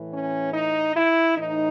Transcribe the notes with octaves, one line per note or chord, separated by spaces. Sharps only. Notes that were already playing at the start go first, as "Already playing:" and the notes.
Already playing: A2 E3
C#4
D#4
E4
A2 E3 D#4